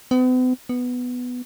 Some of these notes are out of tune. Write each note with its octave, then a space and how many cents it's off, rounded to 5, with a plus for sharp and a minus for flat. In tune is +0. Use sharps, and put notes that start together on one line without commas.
B3 +45
B3 +5